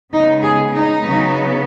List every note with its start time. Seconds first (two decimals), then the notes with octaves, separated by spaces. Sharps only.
0.13 C#3 G#3 B3 D#4
0.43 G#4
0.73 D#4
1.02 C#3 F#3 B3